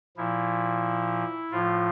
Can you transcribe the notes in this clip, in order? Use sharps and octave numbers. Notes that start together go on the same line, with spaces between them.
A#2 F3 E4
A2 F3 F4